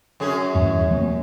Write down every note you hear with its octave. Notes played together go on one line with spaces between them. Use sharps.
F#2 C#4 G#4
D#1 E2 G2
F3 A#3 C4